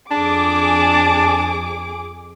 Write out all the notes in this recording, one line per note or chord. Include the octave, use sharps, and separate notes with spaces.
F2 D4 G#4 D6